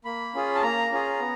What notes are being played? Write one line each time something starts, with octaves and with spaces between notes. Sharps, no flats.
A#3 B5
C#4 F4 G#4
A5
A#3 A#5
C#4 F4 G#4
B3